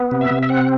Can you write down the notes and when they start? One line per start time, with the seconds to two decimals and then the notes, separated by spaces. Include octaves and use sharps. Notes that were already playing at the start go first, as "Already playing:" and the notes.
Already playing: B3
0.11 C3
0.21 E5
0.31 C3
0.43 E5
0.49 C4 F#5